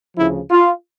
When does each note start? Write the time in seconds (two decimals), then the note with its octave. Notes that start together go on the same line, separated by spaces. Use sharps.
0.17 D2 C#3 F3 E4
0.51 F4